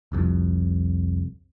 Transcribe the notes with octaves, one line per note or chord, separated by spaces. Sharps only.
F1 C2 F2